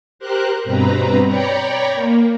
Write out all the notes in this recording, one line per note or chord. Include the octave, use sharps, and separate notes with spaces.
G4 A#4 C5 F#6
G2 B2 C4 B4 A#5
C#5 D5 G5 A#5 B5 C#6
A#3